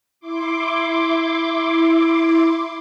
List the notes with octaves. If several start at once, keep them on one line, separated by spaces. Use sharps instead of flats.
E4 C6 D6